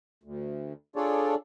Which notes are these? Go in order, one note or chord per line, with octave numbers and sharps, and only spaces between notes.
D2
D4 F4 G#4 A4 C#5 D5